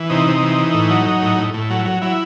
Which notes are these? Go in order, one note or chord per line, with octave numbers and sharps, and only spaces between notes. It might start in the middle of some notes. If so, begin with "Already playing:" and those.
Already playing: E3
C3 D#4
C3
E3
E3
A2
F#3
F#3
A2
A2
A2
F#3
F#3
F#3 E4